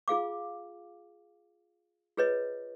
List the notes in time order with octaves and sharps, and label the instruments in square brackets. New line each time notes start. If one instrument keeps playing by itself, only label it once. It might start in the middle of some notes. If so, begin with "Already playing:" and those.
[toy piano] F4 G#4 F5 D6
F4 G#4 B4 C#5 D#5